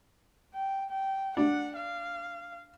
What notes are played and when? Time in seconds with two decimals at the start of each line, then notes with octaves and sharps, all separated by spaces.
0.54 G5
0.90 G5
1.37 D4 F#5
1.76 F5